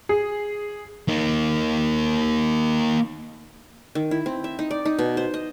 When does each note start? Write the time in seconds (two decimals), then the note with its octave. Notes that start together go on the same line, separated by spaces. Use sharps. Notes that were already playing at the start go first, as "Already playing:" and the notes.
0.09 G#4
1.08 A#3 D#4
3.95 D#3
4.11 E4
4.26 C4
4.44 E5
4.59 D#4
4.71 D5
4.85 D#4
4.99 B2
5.17 C5
5.34 D#5